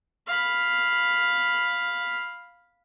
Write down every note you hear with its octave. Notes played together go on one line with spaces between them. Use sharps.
F5 B5